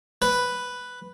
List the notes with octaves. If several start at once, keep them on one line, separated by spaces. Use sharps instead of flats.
B4